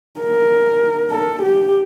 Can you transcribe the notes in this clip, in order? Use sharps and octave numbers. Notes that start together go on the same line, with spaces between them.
A#4
A4
G4